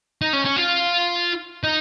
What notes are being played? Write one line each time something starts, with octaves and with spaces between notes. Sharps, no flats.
D#4
C#4
C#4
F4
D#4